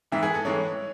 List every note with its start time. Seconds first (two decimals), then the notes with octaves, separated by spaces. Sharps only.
0.12 G#2 E3 G#3 E5
0.23 G#4
0.34 A4
0.45 G#2 E3 G#3 C#5